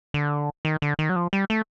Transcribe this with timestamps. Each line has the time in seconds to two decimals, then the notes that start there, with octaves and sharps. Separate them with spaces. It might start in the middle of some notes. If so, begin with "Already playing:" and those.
0.14 D3
0.65 D#3
0.82 D3
0.99 D#3
1.10 F#3
1.16 F3
1.33 G3
1.50 A3